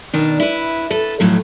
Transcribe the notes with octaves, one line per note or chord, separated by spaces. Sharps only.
B2 D#3 D4
E4 B4
A4 B4
F2 A2 F#3